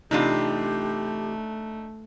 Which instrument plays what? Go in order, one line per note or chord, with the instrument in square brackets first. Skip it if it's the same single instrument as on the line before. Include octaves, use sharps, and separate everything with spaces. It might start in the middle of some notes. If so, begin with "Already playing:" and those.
[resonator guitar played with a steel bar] C3 E3 F4 [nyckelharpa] A3 [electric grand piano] D4 D#4 [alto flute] G4